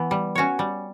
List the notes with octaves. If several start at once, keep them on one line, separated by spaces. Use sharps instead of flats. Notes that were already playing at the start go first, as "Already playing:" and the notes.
Already playing: E3 B3
G3
C#4 F#4 C#5
G3